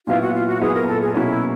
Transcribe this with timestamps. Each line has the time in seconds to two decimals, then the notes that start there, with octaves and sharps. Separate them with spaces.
0.07 A#2 F#3 B3 E4 F4
0.21 F#4
0.33 F4
0.47 F#4
0.60 A#2 F#3 B3 E4 G#4
0.73 A#4
0.87 A4
1.01 G#4
1.14 B2 F#3 A#3 C#4 E4